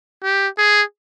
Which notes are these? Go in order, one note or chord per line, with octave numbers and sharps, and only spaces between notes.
G4
G#4